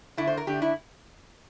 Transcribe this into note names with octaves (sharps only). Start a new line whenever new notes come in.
D3 A3 D4 E4
C5
A#4
D3 A3 D4 G4
E4